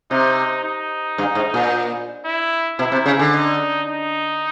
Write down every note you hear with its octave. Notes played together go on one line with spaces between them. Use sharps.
C3 D#4
D#4
G2
G#2
A#2
E4
B2 E4
C3
C#3
D3
D#4
D#4